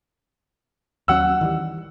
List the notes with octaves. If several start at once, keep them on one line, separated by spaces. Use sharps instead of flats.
D#2 F#3 C#4 F#5 E6
D#3 E3 G3